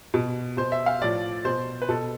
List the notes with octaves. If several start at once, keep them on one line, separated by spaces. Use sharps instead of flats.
B2
B2 C5
E5
F5
A2 F3 D5
B2 C5
B4
B2 A4